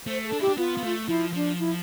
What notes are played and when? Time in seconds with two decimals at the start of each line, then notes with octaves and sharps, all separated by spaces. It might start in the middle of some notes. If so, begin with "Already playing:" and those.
0.06 A3 C5
0.24 A4
0.32 D4
0.40 E4 G4
0.48 D4
0.58 B3 F4
0.77 B3
0.83 A3
1.08 F3 E4
1.33 F3 D4
1.59 E4